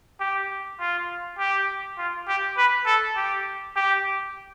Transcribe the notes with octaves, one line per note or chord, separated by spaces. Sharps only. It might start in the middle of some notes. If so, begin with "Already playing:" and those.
G4
F4
G4
F4
G4
B4
A4
G4
G4